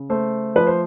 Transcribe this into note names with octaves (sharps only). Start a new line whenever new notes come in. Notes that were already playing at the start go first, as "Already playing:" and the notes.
Already playing: C#3
A3 C5
F3 B4
C5